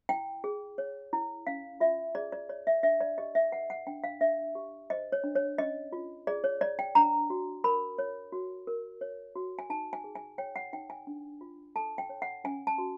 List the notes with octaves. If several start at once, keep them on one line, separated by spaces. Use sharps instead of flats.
E4 G5
G#4
C#5
E4
C#4 F5
F4 E5
G#4 D5
D5
C#5 D5
E5
D4 E5
D5
G4 D#5
E5
B4 F#5
F#5
D4 G5
F5
D4 E5
G4
C5 D#5
C#5
D4
C#5
C#4 D#5
F4
G#4 D5
C#5
C#5 D5
G5
D4 A#5
F#4
A#4 B5
C#5
F#4
A#4
C#5
F#4
G#5
D#4 A5
G#5
G#4
G#5
C#5 G5
F#5
D#4 G5
G#5
D4
F4
A4 A5
G5
C#5
F#5
C#4 G#5
A5
F#4